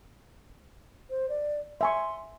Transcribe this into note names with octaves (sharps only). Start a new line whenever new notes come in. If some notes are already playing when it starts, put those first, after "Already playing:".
C5
D5
E5 G#5 C6 C#6